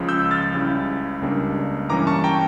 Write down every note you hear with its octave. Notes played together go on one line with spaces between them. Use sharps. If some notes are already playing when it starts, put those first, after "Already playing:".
Already playing: C#2 C#3 F3
E6 G6
F6 A6
C#2 C#3 G3 C#4 E4
C#2 C#3 G3 A#3 D4
G2 E3 G3 A#3 C#4 A#5 D6
A5 C#6
G5 A#5